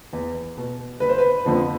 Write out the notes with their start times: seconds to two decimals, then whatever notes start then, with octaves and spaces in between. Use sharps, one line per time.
0.13 E2
0.57 B2
1.00 G1 B4
1.09 C5
1.18 B4
1.45 F2 D3 F3